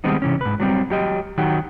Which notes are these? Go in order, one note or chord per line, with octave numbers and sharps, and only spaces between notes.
D#3 G3 G#3 B3 C4 D#4
C3 E3 C#4
G#2 B4
F#3 G3 C4
F#3 G4 D#5
D#3 F#3 F#4 G4